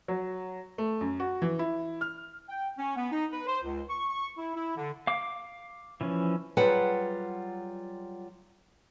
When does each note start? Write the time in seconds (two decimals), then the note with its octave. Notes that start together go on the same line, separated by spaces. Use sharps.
0.08 F#3
0.78 A3
1.01 F#2
1.20 F#4
1.42 E3
1.59 E4
2.01 F6
2.49 G5
2.78 C#4
2.96 B3
3.11 D#4
3.32 B4
3.47 C5
3.63 C#2
3.89 C#6
4.10 C#6
4.38 E4
4.55 E4
4.77 D3
5.07 F5 D6
6.01 E3 F3 C#4
6.57 F#3 G3 F4 G#4 B4 F#5